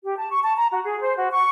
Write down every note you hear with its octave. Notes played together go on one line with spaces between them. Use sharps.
G4
A5
C#6
A5
A#5
F#4
G#4
C5
F#4
C#6